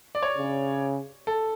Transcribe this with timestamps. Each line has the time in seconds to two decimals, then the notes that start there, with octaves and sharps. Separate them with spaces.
0.15 D5
0.23 C#5
0.38 C#3
1.27 A4